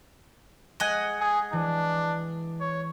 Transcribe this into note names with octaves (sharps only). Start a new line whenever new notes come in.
G#3 D#5 F#5 G#5
G#4
E3 D4
C#5